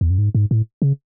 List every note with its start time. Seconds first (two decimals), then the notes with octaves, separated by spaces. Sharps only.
0.01 E2
0.10 F#2
0.18 G#2
0.35 G#2
0.51 A2
0.82 C#3